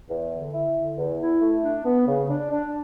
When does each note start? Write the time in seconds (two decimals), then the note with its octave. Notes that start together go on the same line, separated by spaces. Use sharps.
0.09 E2
0.31 D3
0.53 E4
0.75 D3
0.97 E2
1.19 E4
1.41 A3
1.63 D4
1.84 B3
2.07 C#3
2.28 D4
2.50 D4